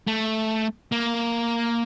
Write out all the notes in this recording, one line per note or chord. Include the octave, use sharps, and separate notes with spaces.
A3
A#3